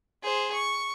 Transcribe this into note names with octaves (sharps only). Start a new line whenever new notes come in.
G#4 C5
C#6